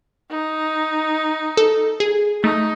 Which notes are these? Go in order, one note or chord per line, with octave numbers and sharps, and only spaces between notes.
D#4
A4
G#4
A3 D#4